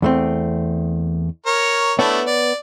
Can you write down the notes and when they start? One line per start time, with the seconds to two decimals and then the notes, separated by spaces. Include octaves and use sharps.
0.02 E2 A3 C4
1.46 A#4 C#5
1.99 A3 B3 D4 E4 C#5
2.26 D5